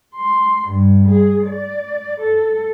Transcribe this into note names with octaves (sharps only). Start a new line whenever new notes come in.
C6
G2
G#4
D5
A4